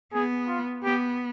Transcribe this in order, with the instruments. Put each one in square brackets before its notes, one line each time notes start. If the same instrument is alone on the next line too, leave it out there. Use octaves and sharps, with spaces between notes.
[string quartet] B3 [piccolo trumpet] G#4
[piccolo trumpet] F4
[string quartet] B3 [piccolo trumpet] G4